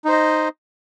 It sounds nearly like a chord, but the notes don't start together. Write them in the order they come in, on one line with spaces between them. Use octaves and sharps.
D#4 C5 D#5